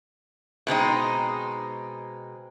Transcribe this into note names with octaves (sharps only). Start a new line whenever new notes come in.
B2 G#3 C4 D#4